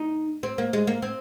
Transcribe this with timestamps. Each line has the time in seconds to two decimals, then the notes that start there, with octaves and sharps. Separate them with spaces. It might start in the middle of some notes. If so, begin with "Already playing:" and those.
Already playing: D#4
0.43 C4
0.58 A#3
0.73 G#3
0.87 A#3
1.02 C4